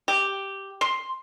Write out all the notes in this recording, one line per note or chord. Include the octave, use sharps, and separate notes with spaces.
G4
C6